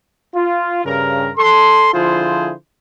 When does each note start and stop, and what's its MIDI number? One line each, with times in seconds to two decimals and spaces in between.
0.34 0.82 65
0.85 1.30 43
0.85 1.30 49
0.85 1.30 70
1.37 1.92 69
1.37 1.92 84
1.93 2.52 50
1.93 2.52 53
1.93 2.52 64
1.93 2.52 65
1.93 2.52 68
1.93 2.52 72